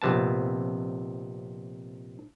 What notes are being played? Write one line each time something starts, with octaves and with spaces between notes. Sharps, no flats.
A#1 F2 C3 B3 A5